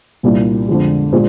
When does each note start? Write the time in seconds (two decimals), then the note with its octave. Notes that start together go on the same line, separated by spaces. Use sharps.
0.23 C2 A#2 G3 A#3 D4
0.68 F2 D3 F3 G#3
1.12 A#2 G#3 D4 F4 C5